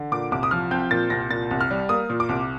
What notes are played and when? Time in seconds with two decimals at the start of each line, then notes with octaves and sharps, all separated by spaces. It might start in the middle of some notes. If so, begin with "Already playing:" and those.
Already playing: D3
0.12 A#2 D6
0.32 C2 D6
0.43 D#6
0.51 F3 F6
0.71 C4 G6
0.91 A#2 A6
1.10 C2 A#6
1.31 A#2 A6
1.51 C2
1.61 F6
1.71 G3
1.89 A#3 D#6
2.10 A#2
2.20 D6
2.29 C2